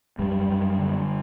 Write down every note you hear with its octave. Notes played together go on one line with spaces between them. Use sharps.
F#2 G3
F#2
D3